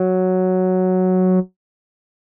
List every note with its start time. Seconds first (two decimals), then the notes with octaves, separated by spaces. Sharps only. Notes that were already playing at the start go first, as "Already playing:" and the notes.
Already playing: F#3